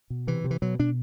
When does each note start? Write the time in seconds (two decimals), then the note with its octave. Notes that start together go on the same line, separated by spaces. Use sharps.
0.10 B2
0.27 C3 E3
0.44 C3
0.51 E3
0.62 B2 F#3
0.79 B2 D4